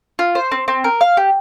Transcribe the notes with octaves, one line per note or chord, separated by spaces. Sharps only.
F4
C5
C4
C4
A#4
F5
G4